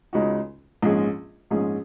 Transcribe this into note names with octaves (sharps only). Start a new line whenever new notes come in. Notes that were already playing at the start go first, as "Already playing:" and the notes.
C#2 C#3 G#3 D#4 F#4
A#1 G#2 G#3 C#4 G#4
A#1 G#2 G#3 C#4 G#4